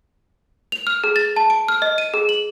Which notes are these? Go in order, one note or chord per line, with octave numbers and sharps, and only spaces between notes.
F7
F6
G#4
A6
A5
D7
F6
D#5
D#7
G#4
F#7